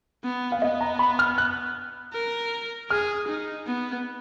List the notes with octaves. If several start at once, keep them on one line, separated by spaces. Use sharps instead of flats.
B3
F5
B3 D#5
A#5
B5
F6
F#6
A#4
G#4 F6
D#4
B3